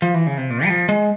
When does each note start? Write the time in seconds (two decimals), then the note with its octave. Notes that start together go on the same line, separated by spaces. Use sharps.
0.02 F3
0.14 E3
0.27 C#3
0.38 C3
0.50 A#2
0.64 G3
0.69 F3
0.89 G#3